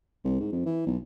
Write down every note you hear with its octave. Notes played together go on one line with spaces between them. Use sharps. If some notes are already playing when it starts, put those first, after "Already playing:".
C2
G#2
F2
E3
B1